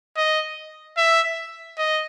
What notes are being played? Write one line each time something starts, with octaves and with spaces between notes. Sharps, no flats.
D#5
E5
D#5